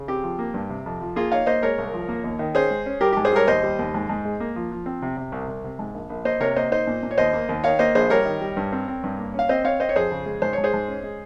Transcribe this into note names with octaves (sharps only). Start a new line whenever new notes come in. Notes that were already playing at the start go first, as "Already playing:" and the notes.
Already playing: C#3
C4 G4
F3
A#3
G2
C3
F2
F3
A#3 F4 G#4
D#4 C#5 F5
A#3 C5 D#5
G#3 A#4 C#5
C2
F3
A#3
D#2
D#3
C#4 G#4 C5
G#3
C#4
G3 G4 A#4
G#2 G4
G#4 C5
G3 A#4 C#5
D#2 C5 D#5
G3
D#2
G#2
G#2
G#3
A#3
F3
F3
C4
C3
C3
C2
C2
C3
G#2
A#1
A#1
A#3 C5 D#5
C3 A#4 C#5
A#3 C5 D#5
D#4 C5 D#5
A#2
A#2
C#5
D#2 C5 D#5
A#3
D#2
D#3 C#5 F5
A#3 C5 D#5
A#1 G#4 C5
G3 A#4 C#5
D#3
G3
G2
C4
C4
G2
A#3
C#4 F5
C4 C5 D#5
C4 C#5 F5
C4 C5 D#5
C#5
F2 G#4 C5
C#3
G#3
G#2 C5
G#2 C#5
G#4 C5
G#2
C#4
G#3